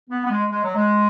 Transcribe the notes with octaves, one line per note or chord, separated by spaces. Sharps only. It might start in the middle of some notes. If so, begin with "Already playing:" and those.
B3
B3
G#3
G#3
F#3
G#3